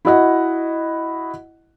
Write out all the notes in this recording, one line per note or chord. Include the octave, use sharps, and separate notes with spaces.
E4 F#4 D#5 F#5